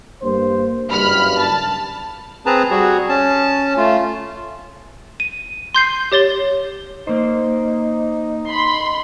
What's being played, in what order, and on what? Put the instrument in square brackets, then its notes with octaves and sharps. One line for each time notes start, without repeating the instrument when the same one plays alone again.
[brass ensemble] G2 A#3 C5
[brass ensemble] F#1 G2 [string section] B5 F6
[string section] A5
[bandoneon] C4 G#4 B4 A5 A#5
G3 F#4 G#4
C#4 A5
A3 F4
[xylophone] D#7
C6 G6 C7
G4 C#5 A6 G7
[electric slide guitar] A#3 C5 [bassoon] D#4
[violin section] B5 C6